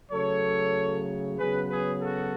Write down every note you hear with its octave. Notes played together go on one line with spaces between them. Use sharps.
C#3 F#3 A3 A4 C#5
C#3 F#3 B3 G#4 B4
G#4 B4
F#4 A4